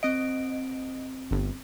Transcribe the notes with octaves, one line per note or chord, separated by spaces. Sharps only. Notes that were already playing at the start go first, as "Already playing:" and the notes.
C4 D#5 D7
G1